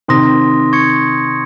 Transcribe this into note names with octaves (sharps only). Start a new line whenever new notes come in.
C3 D#3 C6 D#6 A#6
C#6 G#6 C#7